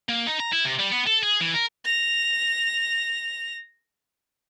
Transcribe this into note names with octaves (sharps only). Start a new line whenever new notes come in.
A#3
D#4
A#5
E4
C3
G3
B3
A4
G#4
E3
A#4
A#6 F7